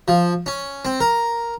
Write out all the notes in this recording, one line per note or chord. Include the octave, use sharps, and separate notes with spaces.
F3
C#4
C4
A#4